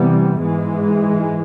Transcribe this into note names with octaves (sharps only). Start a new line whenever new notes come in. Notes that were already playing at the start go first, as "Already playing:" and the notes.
Already playing: C3 E3 G3 B3
G#2 E3 G#3